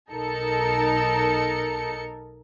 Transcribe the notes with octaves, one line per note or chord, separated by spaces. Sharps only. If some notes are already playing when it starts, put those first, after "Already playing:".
B1 D#4 A4 A#4 C#7